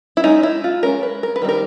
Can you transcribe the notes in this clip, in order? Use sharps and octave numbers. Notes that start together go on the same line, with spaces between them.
E4
G#3 C#4 D#4
E4
F4
G#3 C#4 A#4
B4
A#4
B4
D#3 G3 C4 D#4
A#4